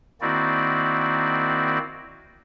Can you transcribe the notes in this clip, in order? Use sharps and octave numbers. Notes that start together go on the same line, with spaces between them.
D#3 A#3 C4 E4 F#4 D5